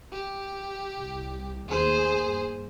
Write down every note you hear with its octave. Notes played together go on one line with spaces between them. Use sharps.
G4
C2
D#2 A3 A#3 G#4 C5
G2